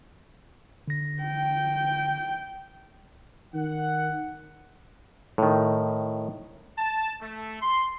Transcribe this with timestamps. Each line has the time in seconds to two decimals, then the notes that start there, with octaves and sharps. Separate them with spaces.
0.88 D3 A#6
1.22 G5
3.54 D#3 F#5
5.38 A2 D#3
6.78 A5
7.21 A3
7.62 C6